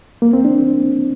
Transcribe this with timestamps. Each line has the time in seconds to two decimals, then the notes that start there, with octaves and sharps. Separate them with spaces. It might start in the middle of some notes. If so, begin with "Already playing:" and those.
0.22 A#3
0.33 C4
0.45 D4